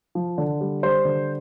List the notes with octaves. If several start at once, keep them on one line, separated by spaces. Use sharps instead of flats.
F3
D3
G3
G3 C5
D3